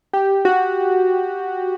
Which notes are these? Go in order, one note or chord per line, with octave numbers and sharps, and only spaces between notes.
G4
F#4